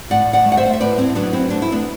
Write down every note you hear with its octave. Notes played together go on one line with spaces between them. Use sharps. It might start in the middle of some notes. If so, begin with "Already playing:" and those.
A2 D5 F#5
D5 F#5
A3
F#5
C5 E5
F#5
E5
A2 B4 D5
C4 E4
F#3 B3 D4
C4 E4
A3 D4
E4
B3 D4